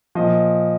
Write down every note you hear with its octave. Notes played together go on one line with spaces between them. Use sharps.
A#2 F3 D#5